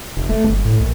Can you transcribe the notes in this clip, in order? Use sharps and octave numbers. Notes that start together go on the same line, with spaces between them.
F1
A3
G1
A2
A#1